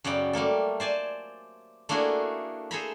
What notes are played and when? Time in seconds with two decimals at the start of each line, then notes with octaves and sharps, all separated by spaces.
0.04 F#2 C#3 B3 D5 G5
0.33 G3 A3 A#3 A4
0.80 C5 D5 G#5 A5
1.89 A3 A#3 D4 E4 F#4 G#4
2.71 G#4 A4 C5 E5 A#5 B5